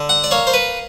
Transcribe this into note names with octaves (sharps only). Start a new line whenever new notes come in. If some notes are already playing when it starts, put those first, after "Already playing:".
Already playing: D3
F#5
D5
A#3 C#5
C5
B4